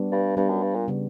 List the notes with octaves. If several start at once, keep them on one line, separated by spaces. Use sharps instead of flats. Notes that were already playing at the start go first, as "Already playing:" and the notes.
Already playing: G3 B3 D4
G2
G2 G3 B3 D4
F#2
G2
A#2
C#3 G3 B3